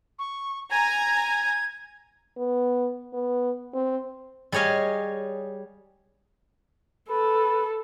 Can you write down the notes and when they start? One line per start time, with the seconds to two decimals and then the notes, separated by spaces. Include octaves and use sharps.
0.19 C#6
0.71 G#5 A#5 G#6
2.37 B3
3.13 B3
3.74 C4
4.52 G3 G#4 C#5 D#5 F5
7.10 A4 B4